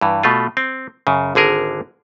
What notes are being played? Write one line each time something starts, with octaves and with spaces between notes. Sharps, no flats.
G2 E3
B2 A3 F4
C4
F#2 C#3
G#1 D3 G#4 A#4